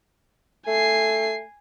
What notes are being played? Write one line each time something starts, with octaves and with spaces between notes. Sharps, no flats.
A3 G#5 C7